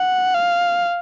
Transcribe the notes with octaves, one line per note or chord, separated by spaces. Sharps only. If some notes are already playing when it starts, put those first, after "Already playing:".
Already playing: F#5
F5